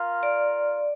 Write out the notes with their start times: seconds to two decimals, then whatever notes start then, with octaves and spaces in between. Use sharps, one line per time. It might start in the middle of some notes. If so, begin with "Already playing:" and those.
Already playing: F4 A#4 F5
0.23 D5